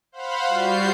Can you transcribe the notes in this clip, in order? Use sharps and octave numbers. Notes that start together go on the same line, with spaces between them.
C5 F5 F#5 B5
G3 F4 F#4 G6 C7